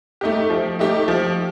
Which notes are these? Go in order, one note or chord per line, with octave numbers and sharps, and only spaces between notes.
A3 D#4 G4
F3
A3 D#4 G4
F3